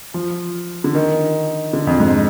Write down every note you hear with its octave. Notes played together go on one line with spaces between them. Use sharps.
F3
D3
D#3
D3
F2
G#2